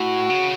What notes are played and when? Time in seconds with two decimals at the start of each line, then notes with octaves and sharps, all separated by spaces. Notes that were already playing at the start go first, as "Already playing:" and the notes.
Already playing: A2 F#4
0.30 C#3